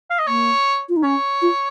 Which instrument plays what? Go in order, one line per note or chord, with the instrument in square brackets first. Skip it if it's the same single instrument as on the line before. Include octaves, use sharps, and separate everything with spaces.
[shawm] F5
D#5
[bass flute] A#3 [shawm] C#5
[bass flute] F4
D#4
[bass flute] C#4 [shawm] C#5
[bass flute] F4